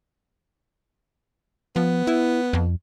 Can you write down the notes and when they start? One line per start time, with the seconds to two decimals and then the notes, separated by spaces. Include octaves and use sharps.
1.76 F3 B3
2.07 E4
2.53 F2